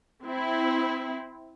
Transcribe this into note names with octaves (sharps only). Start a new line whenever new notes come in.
C4 E4